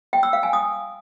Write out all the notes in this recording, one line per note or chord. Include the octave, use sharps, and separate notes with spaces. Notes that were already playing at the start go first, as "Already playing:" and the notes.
G5
E6
F5
G#5
D#6